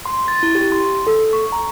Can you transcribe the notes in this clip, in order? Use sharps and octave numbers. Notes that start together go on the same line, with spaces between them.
C6
A6
E4
G4
C6
A4
C#6
A#5